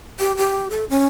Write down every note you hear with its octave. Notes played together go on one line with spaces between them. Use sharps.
G4
G4
A4
C#4